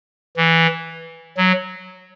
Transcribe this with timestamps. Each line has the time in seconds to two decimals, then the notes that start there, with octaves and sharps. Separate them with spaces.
0.37 E3
1.37 F#3